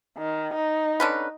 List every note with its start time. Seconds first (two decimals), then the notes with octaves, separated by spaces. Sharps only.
0.18 D#3
0.54 D#4
1.00 D3 C#4 B4